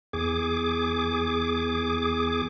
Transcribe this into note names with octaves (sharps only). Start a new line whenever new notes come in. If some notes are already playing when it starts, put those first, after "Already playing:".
E2 G#4 D6